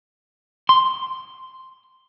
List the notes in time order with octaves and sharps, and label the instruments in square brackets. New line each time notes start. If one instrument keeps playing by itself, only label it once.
[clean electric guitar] C6